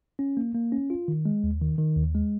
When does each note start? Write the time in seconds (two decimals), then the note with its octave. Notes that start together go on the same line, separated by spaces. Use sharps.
0.19 C#4
0.37 A#3
0.55 A#3
0.72 C#4
0.90 F4
1.08 D#3
1.26 G#3
1.44 D#2
1.61 D#3
1.79 D#3
1.96 D#2
2.15 G#3